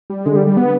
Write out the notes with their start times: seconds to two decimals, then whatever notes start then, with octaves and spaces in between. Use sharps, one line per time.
0.10 G3
0.25 D3 G#3
0.36 G3
0.47 G3
0.57 B3